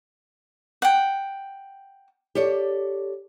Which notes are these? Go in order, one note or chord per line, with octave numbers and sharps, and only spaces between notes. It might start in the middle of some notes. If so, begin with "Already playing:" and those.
F#5 G5
G4 A4 C#5 D5